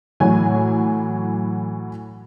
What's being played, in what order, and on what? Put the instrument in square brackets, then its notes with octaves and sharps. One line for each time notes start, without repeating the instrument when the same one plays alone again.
[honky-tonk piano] A2 E3 F#3 G#5